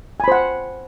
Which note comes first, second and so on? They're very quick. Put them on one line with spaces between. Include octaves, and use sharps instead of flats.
G#5 B5 C5 F#5